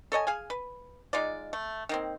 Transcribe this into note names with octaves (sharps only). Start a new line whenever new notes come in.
A4 C#5 D#5 G#5
G#4 F5 G#5
B4
G#3 D#4 F4 D5
A3
D#3 A#3 C4